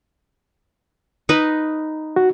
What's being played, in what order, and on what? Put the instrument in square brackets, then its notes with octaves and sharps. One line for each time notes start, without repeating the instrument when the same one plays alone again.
[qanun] D#4 B4
[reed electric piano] F#4